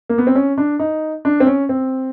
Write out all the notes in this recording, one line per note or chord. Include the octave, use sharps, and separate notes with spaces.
A#3
B3
C4
C#4
D4
D#4
D4
C4
C#4
C4